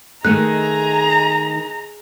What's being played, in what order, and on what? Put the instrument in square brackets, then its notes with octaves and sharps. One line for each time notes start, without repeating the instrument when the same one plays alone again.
[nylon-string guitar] D#3 A3 [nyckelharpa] G#4 D#5 [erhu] A#5 [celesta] F#6